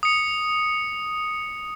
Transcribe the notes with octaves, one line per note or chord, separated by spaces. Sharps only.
D#6 C#7